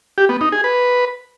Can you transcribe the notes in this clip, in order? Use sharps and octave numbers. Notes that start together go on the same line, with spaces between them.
G4
B3
D#4
G#4
B4